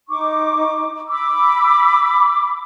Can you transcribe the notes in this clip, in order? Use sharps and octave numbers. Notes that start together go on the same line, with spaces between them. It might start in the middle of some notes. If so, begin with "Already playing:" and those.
D#4 C#6 D6
B5 D6 E6